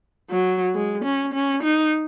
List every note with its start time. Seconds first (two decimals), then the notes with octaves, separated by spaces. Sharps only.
0.31 F#3
0.75 G#3
1.04 C#4
1.34 C#4
1.63 D#4